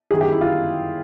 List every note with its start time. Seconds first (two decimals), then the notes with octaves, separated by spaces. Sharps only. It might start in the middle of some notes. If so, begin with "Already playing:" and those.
0.11 G1 F#2 D#3 G#4
0.21 G4
0.31 E4
0.41 F4